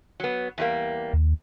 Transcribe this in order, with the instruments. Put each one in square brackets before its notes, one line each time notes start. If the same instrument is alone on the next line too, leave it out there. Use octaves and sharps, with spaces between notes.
[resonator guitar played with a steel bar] F#3 B3
E2 G3 A#3
[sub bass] D#2